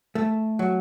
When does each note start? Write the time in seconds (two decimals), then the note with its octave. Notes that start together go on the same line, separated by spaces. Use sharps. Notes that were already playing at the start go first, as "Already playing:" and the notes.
0.15 A3
0.59 F#3